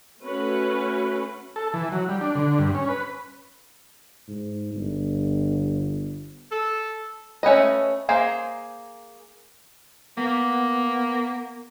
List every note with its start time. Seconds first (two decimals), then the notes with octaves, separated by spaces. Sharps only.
0.22 A3 C#4 F#4 B4
1.56 A4
1.74 E3
1.92 F#3
2.09 G3
2.21 D4
2.35 D3
2.59 G2
2.75 C#4
2.89 B4
4.28 G#2
4.74 G1
6.52 A4
7.43 A3 C#4 B4 D#5
8.09 A#3 G#4 C5
10.17 A#3 B3